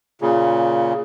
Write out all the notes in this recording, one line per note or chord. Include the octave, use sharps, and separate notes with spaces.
A#2 C#3